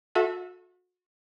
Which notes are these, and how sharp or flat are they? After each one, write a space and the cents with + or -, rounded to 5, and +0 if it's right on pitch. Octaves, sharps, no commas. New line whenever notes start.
F#4 -35 A4 -10 E5 +0